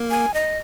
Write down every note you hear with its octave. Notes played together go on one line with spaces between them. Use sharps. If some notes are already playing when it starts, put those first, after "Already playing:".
Already playing: A#3 A#4
G#5
D#5